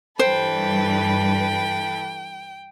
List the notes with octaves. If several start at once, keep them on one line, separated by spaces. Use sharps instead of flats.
G2 E3 A4 B4 C5 G5